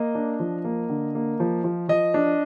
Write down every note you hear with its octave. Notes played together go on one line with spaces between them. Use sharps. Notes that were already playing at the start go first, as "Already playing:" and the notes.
Already playing: A#3 D#5
D4
F3
A#3
D3
A#3
F3
F3
F3 D#5
D4